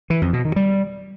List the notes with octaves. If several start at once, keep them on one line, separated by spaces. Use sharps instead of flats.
E3
F2
B2
D#3
G3